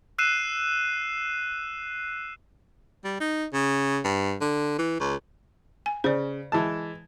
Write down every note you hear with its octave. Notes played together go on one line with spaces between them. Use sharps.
E6 F#6 C7 D#7 E7
G3
D#4
C#3
G2
D3
E3
C#2
G#5
C#3 C5 D5
E3 G#3 A5